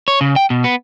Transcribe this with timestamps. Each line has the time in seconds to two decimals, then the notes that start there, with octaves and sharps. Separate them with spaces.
0.08 C#5
0.21 C#3
0.36 G5
0.50 B2
0.64 B3